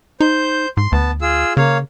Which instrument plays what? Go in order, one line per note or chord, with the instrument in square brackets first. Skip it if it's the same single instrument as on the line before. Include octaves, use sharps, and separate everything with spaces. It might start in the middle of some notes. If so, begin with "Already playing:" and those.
[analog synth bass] D#4 [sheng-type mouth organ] C5 G6
[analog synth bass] G#2 [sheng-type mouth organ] C6
[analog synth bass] D2 [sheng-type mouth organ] B3 A5
[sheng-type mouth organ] F4 G#4 E6
[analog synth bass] C#3 [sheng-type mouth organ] A#3 C#5 F5